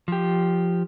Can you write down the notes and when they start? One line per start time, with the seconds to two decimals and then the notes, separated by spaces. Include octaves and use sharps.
0.08 F3 G4